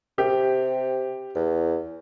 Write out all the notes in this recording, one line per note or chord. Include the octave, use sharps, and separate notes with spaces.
C3 G4
E2